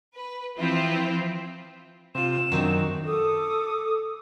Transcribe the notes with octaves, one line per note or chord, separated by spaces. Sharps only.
B4
E3 F3 C4 E4 F4
C3 F4 E7
F#2 D#3 C4 D4 D#4
A4 D6 D#6